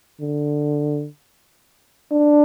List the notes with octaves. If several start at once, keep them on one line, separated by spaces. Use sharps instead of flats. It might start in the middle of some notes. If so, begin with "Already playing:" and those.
D3
D4